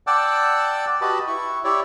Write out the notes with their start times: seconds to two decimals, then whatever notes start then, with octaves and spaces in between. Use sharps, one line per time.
0.07 D5 F#5 G5 A5 D6 E6
1.01 F#4 G4 B4 D#5 A5 B5
1.28 E4 C#6
1.64 E4 G4 C#5 D5 E5